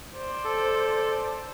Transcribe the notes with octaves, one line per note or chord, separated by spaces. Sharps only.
C5 D5
A4